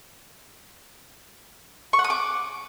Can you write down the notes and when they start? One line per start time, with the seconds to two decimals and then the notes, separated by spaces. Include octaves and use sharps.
1.93 C#6
1.99 F#5
2.04 D#6
2.10 D6